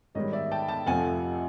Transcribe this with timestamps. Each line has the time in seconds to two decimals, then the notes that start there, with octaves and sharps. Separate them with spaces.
0.15 G#2 D#3 G3 C#5 D#5
0.33 D5 E5
0.52 G5 A5
0.69 G5 A5
0.86 F2 C3 F3 A3 F#5 G#5